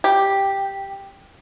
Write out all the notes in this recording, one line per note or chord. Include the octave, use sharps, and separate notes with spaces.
G4